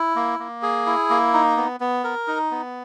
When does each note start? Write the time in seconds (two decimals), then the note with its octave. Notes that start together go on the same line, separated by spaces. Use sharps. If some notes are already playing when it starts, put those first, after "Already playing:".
Already playing: E4
0.15 A#3
0.39 A#3
0.63 G#4
0.86 E4
1.10 A#3
1.33 D#4
1.57 B3
1.80 B3
2.04 A#4
2.27 D#4
2.51 B3